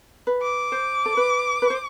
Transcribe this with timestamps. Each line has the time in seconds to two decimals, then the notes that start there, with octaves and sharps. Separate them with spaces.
0.27 B4
0.42 D6
0.72 C5
1.06 A4
1.17 B4
1.62 B4
1.70 C5